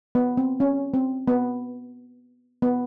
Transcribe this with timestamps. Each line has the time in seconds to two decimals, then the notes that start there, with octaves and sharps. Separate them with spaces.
0.15 B3
0.37 C4
0.60 C#4
0.94 C4
1.28 B3
2.62 B3